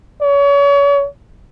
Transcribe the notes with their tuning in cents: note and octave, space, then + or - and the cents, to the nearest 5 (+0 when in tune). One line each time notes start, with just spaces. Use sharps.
C#5 +35